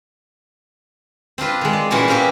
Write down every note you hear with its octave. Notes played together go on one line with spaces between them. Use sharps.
C4 D4 F4 B4
D#3 G#3
D5
A#2 E3 C#4 F#4 G#4
A#3 C4 C#4 G4 A#4 B4